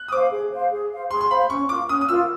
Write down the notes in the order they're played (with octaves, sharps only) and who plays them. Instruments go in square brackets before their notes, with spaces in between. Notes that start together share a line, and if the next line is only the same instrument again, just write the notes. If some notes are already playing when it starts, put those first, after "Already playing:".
Already playing: [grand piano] F#6
D#6
[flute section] C5 F5 [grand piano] D6
[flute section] G#4
C5 F5
G#4
C5 F5
[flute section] G#4 [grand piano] C6
[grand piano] C6
[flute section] C5 F5 [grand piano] B5
[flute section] C#4 [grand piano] C#6
[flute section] F4 A#4 [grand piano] D6
[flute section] C#4 [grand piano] D#6
[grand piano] D#6
[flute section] F4 A#4 [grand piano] E6